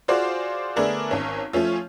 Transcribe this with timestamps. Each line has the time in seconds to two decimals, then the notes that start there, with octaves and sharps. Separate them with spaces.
0.08 F4 F#4 G#4 C5 D5 F5
0.76 D3 A3 B3 D4 G#4 A#4
1.11 G#1 C#4
1.53 F3 A3 C#4 F4